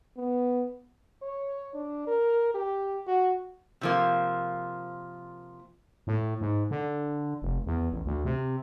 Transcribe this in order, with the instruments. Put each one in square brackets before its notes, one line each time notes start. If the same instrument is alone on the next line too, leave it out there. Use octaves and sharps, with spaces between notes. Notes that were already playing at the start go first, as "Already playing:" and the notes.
[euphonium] B3
[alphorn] C#5
D4
A#4
G4
F#4
[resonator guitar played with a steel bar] C3 F3 A#3
[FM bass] A2
G#2
D3
F1
E2
A1
D2
C3